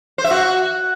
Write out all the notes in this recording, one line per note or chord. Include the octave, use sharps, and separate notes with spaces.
C5
E5
F#4